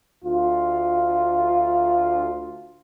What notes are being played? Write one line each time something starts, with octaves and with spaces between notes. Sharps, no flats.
D2 F4